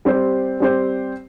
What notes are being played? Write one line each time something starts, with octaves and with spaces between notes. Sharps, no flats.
G3 C4 G4 C5
G3 C4 G4 C5